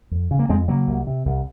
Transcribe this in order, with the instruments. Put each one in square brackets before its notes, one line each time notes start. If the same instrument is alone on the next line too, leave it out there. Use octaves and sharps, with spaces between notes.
[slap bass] F2
C#3
A#3
F2 G#3 C4
C#3 F#3 A#3
C2
C3
C2